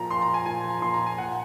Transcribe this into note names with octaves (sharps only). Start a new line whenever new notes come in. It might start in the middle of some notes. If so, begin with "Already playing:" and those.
Already playing: A#2 F3 A#5
A#2 C6
A#5
F3
G#5
A#2 G#5
F3
A#5
A#2 C6
A#5
F3
G#5
A#2 F#5